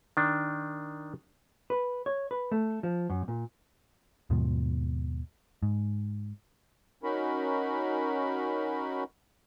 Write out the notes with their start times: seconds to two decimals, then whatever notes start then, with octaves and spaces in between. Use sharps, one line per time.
0.17 D#3 D4
1.70 B4
2.06 C#5
2.31 B4
2.52 A3
2.83 F3
3.10 F#2
3.28 A#2
4.30 D#2 G#2 B2 F3
5.63 G#2
7.03 C#4 D#4 F#4 A#4 B5